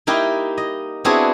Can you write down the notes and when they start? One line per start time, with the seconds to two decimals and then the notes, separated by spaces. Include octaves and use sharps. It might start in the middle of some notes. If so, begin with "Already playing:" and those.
0.07 A#3 D#4 E4 G4 D#5 G5
0.57 D#5
1.05 B3 C4 D4 E4 F#4 G#4